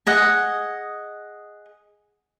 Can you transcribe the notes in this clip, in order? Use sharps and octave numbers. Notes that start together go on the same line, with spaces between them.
G#4 D#5 F#5